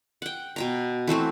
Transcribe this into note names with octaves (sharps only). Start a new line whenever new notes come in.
F#5 G5
B2 G5 A#5
E3 A3 C4 F#4